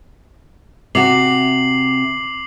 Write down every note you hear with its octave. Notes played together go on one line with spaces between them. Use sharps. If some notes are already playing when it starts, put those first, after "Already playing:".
C3 F#4 D6 C7 F#7